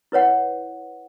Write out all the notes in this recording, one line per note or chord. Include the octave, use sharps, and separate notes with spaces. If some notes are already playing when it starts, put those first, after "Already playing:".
E4 B4 C#5 F#5